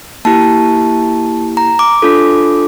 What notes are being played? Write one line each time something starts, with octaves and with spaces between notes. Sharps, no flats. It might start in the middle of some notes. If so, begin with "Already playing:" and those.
A#3 E4 G4 A5
A#5
D6
D4 F4 A4